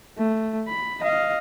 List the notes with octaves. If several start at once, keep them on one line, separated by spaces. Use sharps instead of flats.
A3
B5
D#5 F5